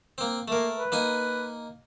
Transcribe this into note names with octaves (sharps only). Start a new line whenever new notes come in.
A#3 C4
A3 A#3 A#4
B4
A#3 D#4 G#5